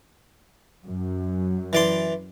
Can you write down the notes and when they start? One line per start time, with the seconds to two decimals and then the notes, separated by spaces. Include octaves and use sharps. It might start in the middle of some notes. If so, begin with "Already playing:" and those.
0.85 F#2
1.73 E3 D5 C6